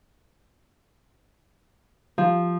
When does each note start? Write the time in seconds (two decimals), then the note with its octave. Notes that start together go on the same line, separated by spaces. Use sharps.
2.18 F3